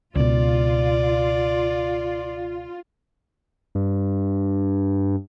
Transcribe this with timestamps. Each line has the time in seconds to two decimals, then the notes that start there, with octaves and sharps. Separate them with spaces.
0.16 C#2 B2 F4 D5
3.75 G2